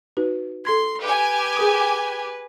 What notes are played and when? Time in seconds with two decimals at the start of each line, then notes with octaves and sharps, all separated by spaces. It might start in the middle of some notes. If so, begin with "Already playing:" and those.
0.17 D#4 F#4 B4
0.65 A4 C6 G#6
1.02 G4 B4 G#5
1.57 G#4 A#4 D#6